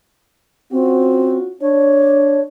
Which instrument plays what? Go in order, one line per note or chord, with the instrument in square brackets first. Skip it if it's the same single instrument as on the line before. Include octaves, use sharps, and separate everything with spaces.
[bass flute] C4 [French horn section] C#4 F4 F#4
[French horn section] D4 [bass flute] C#5